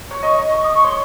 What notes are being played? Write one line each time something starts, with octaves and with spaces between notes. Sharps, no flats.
C#5
D#5 C#6
D#5
C#6
D#6
C#6
C#5 C6